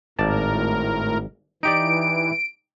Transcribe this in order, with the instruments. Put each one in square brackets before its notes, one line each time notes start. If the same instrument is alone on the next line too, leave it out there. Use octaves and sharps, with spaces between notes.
[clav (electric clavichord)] G#1 D5 A5 [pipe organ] A2 A#4
[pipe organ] E3 [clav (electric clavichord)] D#4 G4 D5 [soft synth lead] D7